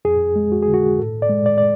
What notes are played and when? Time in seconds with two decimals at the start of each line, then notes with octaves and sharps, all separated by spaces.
0.05 F2 G#4
0.36 G#3
0.52 F#4
0.62 G#4
0.68 D3
0.74 F#4
0.98 A2 A4
1.22 D5
1.30 G#3
1.46 D5
1.58 D5